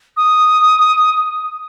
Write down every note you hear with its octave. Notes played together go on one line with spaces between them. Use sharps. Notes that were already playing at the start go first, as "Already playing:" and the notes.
D#6